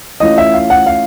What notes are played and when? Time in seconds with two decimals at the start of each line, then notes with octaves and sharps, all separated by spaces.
0.20 E3 A3 C#4 F4 D#5
0.38 E5
0.54 F5
0.70 F#5
0.86 F5